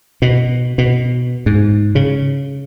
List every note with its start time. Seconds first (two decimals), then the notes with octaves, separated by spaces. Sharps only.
0.22 B2
0.78 B2
1.46 G#2
1.95 C#3